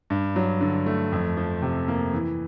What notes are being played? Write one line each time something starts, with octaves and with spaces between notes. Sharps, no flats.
G2
F#3
D3
A3
F2
F3
C3
A#3
E3